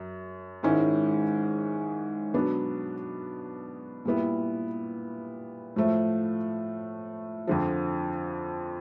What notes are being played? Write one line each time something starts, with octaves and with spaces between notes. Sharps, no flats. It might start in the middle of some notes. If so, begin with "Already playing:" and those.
Already playing: F#2
G#2 D#3 G#3 C#4 E4
B2 F#3 B3 D4
A#2 G3 B3 E4
A2 F3 A3
F2 D3 F3